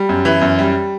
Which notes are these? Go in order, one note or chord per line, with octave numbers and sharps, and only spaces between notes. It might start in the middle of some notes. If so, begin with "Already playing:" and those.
Already playing: G3
F#2
E3
F#2
G3